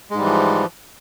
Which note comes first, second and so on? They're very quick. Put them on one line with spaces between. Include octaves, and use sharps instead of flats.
G#3 G#2 G3 E3 F3